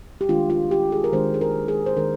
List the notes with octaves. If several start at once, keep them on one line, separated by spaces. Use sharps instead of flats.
G4
D#3 G#3 D4 F4
F4
G4
G#4
A#4
D#3 G#3 D4 C5
G#4
A#4
G#4
C5
D#3 G#3 D4 A#4